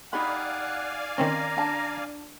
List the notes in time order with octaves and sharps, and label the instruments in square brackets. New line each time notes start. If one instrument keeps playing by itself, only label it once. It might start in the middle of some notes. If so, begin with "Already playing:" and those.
[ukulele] D#4 G4 B5 [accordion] D5 F5 G#5 [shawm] F#5
[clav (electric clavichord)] D#3 C4 C#4 [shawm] A#5
[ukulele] D4 A5